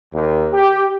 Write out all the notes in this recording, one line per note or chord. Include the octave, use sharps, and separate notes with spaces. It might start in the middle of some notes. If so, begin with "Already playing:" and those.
D#2
G4